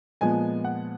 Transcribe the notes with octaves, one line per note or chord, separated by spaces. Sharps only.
A#2 F3 G#3 B3 G#5
F#5